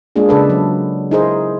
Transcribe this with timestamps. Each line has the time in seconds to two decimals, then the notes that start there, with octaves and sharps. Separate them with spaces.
0.16 G#3 A#3 D4 F4 G#4
0.29 C#3 D4 A4 B4
0.50 F#3
1.11 D#4 E4 G#4 A#4 C5 D#5